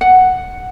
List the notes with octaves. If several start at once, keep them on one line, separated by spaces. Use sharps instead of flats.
F#5